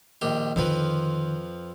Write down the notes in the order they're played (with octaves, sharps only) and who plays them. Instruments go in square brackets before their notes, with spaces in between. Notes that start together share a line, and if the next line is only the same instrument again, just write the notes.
[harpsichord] A#1 D#3 G4
[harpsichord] F2 F3 B4 [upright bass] D3 D#3